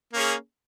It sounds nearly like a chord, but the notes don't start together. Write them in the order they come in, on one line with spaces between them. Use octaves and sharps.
A#3 C#4 G#4